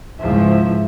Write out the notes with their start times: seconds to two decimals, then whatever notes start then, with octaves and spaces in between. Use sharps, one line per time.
0.21 C#2 G#2 F3 E4 E5